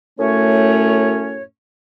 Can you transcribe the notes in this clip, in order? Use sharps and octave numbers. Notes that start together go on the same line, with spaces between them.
F#2 A2 A3 C#4 C#5